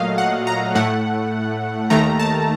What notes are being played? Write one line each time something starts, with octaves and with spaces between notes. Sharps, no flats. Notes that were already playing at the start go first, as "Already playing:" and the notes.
Already playing: A#2 F#3 A3 D#5 F5
F#5
A#5
A2 A3 F#5
D#2 D#3 A3 A#5
A5